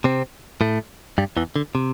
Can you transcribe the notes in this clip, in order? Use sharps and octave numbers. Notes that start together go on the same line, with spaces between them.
C3 C4
A2 A3
G2 G3
E2 E3
D3
C3